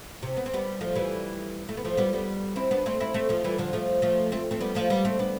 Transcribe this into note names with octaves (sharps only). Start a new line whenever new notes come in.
C3
B3
C4
G3 B3
F3 A3
E3 G3
A3
B3
F3 A3
G3 B3
G3 B3
C4 E4
B3 D4
A3 C4
C4 E4
A3 C4
F3 A3
E3 G3
D3 F3
F3 A3
F3 A3
A3 C4
A3 C4
G3 B3
F3 A3
G3 B3
A3 C4
B3 D4